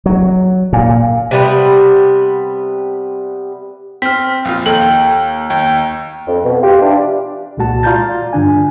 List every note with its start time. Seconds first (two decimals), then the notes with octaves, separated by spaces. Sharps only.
0.06 F#3
0.73 A#2
1.31 C3 G3 B3
4.02 C4 F6 B6
4.45 A#1 F4
4.66 D#2 A4 G5
5.50 D#2 G5
6.27 F2
6.44 B2
6.62 F4 G4
6.81 E3 D4 D5
7.57 C2 A#2 G#3 F#4 A5
7.83 F4 D5 A#5 G6 A6
8.33 G2 D3 D4 G#5